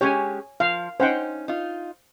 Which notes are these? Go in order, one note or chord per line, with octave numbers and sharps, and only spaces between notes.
G#3 C#4 G4 C#5 G#5
F3 F5
C#4 D#4 C5 F#5 G5
D#4 F4